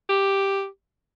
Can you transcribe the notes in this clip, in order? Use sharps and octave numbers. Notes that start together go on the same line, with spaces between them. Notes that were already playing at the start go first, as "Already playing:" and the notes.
G4